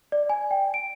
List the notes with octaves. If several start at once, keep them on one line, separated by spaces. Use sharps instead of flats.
D5
G#5
G5
D7